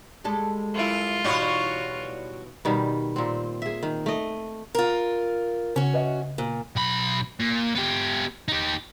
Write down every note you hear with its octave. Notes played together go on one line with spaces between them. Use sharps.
G3 G#3 A4
F#2 E4 F4
B2 E3 G3 D#4 F#4 C#5
B2 D#3 G3
A#2 C4
G#4 E5
D#3
A3 D#5
F4 A#4
C#3 C#4 F#4
B4 D#5 E5
A#2
B1 B5
A#2
B3 G4
D#4 G4